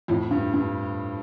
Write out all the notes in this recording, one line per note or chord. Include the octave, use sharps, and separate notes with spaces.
F2 A2
G2
G2